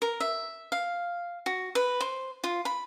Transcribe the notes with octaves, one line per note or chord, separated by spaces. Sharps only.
A#4
E5
F5
F#4
B4
C5
F4
B5